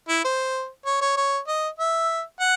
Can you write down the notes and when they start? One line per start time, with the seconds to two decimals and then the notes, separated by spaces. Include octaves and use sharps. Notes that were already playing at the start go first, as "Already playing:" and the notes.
0.09 E4
0.25 C5
0.86 C#5
1.01 C#5
1.17 C#5
1.47 D#5
1.79 E5
2.40 F#5